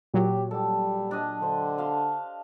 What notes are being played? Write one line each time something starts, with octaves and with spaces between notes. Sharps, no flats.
A#2 F#3 G4
G3 G4 A4
D4 D#5 A5
D3 C5
F5 A5 C6